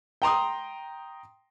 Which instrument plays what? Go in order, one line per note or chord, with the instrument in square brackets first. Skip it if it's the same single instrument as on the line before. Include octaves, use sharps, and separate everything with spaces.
[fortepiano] G5 A#5 C6 D#6